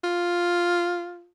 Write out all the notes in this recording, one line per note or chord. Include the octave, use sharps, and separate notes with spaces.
F4